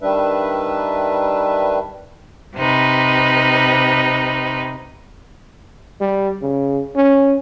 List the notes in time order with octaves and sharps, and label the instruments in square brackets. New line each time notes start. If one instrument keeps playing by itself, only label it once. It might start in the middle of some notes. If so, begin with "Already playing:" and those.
[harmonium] D#3 G3 D4 B4 E5
[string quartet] C3 D#4 B4
[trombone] G3
C#3
C#4